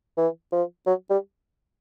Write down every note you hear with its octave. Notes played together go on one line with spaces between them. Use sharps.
E3
F3
F#3
G3